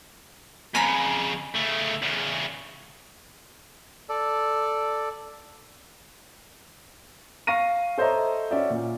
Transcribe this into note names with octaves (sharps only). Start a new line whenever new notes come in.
F2 C#3 G#5 A#5 B5
C#3 A3
E2 C#3
A4 D5
F5 C#6 A#6 D#7
A4 C5 C#5 D#5 E5 A#5
C#4 F#4 D5 E5
A#2